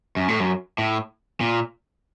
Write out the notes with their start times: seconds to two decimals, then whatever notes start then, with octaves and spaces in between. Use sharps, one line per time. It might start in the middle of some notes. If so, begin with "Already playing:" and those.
0.16 F#2
0.28 A2
0.40 F#2
0.78 A2
1.40 A#2